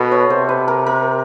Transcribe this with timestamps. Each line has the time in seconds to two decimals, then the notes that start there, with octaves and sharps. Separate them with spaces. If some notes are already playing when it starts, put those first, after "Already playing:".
Already playing: B2 A4 B4
0.12 C#5
0.30 C3 C5
0.49 B4
0.68 A#4
0.86 A#4